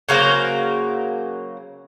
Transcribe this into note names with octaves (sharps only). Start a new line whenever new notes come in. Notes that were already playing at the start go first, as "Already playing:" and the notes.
C#3 F#3 A#3 C5